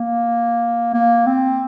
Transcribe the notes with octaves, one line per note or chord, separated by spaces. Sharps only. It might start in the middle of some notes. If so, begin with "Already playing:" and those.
Already playing: A#3
A#3
C4